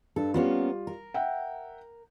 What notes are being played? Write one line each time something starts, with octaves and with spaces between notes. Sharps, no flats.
G2 A4
G3 A#3 B3 C#4 F4
A#4
E5 F#5 G5